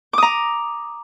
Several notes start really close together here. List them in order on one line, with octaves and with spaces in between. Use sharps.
D6 D#6 A#5